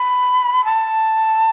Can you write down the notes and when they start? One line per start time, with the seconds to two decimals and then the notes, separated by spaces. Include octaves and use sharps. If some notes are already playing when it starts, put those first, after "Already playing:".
Already playing: B5
0.65 A5